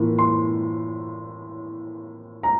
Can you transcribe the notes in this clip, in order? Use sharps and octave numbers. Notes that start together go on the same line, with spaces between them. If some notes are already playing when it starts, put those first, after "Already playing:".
Already playing: A2 E3 A#3 F4
C6
A#5